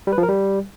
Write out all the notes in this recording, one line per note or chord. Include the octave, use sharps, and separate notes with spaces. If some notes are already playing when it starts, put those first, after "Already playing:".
G3
B4
F3
A#4
G3